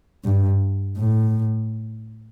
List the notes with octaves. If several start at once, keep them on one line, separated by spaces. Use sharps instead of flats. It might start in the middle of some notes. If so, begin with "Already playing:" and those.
G2
A2